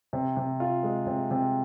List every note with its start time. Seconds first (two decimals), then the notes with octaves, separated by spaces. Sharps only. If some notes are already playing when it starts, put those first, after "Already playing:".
0.13 C3
0.37 C3
0.60 F4
0.83 G#3
1.07 C3
1.31 C3